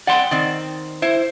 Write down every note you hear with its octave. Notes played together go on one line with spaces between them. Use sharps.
D5 F#5 G5 C6
D#3 C4 D5
E4 C5